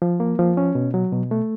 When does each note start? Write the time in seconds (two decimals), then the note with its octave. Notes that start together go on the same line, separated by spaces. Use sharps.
0.02 F3
0.20 A#3
0.39 F3
0.57 C#4
0.75 B2
0.94 F#3
1.12 B2
1.31 A3